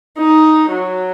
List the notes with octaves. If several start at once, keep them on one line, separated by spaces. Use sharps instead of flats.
D#4
F#3